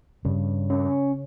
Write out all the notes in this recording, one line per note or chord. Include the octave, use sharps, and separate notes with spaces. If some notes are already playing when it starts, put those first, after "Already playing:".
G2 C#3
C#4